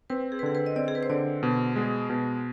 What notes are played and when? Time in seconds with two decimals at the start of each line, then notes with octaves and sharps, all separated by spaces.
0.10 C4 B4
0.32 G#4
0.39 B4
0.43 D3 G#4
0.55 B4
0.66 D#5
0.76 C4 D5
0.88 G#4
0.95 B4
1.03 C5
1.09 D3 D5
1.43 B2
1.76 G#3
2.10 B2